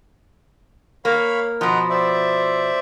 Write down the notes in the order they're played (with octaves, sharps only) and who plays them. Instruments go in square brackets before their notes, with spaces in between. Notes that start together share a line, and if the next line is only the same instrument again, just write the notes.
[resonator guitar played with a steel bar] A#3 [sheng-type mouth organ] C#5 F5 B5
[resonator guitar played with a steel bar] B2 F3 [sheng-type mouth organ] D#5 F#5 A#5
[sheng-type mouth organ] C5 D5 E5